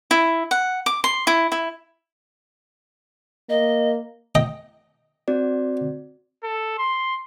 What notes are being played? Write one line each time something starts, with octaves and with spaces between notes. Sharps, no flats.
E4
F#5
D6
C6
E4
E4
A#3 D#5
D#5 G5
C4 F#4 D5
A4
C6